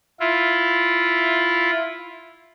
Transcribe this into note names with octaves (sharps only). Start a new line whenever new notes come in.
E4 F4